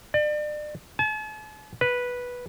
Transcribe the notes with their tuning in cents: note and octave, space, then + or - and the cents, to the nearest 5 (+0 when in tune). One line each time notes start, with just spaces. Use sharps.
D5 +35
A5 -45
B4 -10